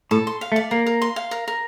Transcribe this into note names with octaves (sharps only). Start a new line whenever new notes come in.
A2 A4
C6
F5
A3
D5
A#3 A#4
A#4
C6
F5
A#4
A#4